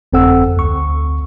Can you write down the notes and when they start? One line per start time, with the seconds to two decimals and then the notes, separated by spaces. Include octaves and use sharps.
0.13 G1 F2 C4 A4 F#5 E6
0.57 D2 C#6